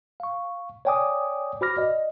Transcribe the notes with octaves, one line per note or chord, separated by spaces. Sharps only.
F5 C#6
C#5 D5 G5 G#5 D6 D#6
F#4 C5 B5 D6 F6 A#6
D5 D#5